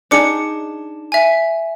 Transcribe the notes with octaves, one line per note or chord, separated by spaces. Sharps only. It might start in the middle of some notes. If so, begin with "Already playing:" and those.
D4 D#4 G#4 D6 C#7
E5 G#5